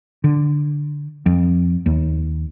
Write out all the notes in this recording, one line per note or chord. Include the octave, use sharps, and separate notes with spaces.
D3
F2
D#2